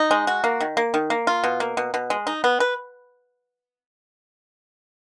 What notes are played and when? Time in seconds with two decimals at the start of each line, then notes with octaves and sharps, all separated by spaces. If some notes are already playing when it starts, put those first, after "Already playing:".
Already playing: D#4
0.11 G#3
0.27 F#4
0.44 A#3
0.60 D#3
0.77 A#3
0.94 D#3
1.10 A#3
1.27 F4
1.44 B2
1.60 A#3
1.77 B2
1.94 B2
2.10 G#3
2.27 D#4
2.44 B3
2.60 B4